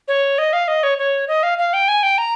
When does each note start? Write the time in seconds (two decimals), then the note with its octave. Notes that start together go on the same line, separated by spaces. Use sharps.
0.08 C#5
0.38 D#5
0.53 F5
0.68 D#5
0.83 C#5
0.98 C#5
1.28 D#5
1.43 F5
1.58 F5
1.73 G5
1.88 G#5
2.03 G5
2.18 A#5